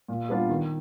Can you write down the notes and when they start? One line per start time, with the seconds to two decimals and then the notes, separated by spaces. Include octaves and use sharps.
0.08 A#2
0.29 G3 B3 D4 F4
0.49 D#3